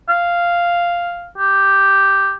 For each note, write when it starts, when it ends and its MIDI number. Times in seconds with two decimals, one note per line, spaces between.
0.09 1.26 77
1.38 2.34 67